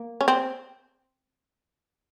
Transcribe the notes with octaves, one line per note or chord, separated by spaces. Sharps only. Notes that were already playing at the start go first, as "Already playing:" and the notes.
Already playing: A#3
C#4
C4